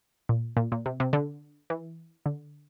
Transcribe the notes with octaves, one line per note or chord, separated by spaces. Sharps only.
A#2
A#2
A#2
C3
C3
D3
E3
D3